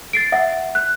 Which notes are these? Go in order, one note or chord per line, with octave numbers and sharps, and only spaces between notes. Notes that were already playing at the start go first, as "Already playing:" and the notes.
A6 C7 D7
E5 F#5
F#6